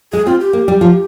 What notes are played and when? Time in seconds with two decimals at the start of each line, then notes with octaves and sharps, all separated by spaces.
0.13 G#3 G#4
0.26 C4 F4
0.40 G4
0.53 A#3
0.68 G3
0.81 F3